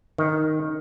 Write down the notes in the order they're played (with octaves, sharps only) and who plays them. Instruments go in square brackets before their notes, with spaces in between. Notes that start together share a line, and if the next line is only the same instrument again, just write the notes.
[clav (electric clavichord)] D#3